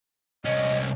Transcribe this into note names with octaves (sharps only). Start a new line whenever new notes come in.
C2 C#4 D#5